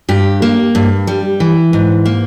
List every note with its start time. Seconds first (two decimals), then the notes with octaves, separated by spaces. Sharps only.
0.09 G2 G4
0.42 A#3
0.75 G2
1.07 G3
1.40 E3
1.73 G#2
2.06 A#3